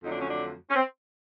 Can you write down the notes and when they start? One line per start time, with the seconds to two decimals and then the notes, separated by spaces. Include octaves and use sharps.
0.03 F2 D3 F#3 A3 D#4
0.12 D4
0.20 C#4
0.29 D4
0.70 C#4
0.75 C4